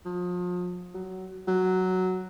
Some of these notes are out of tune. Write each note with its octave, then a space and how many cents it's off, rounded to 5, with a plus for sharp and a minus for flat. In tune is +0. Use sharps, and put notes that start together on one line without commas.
F3 +35
F#3 +15
F#3 +5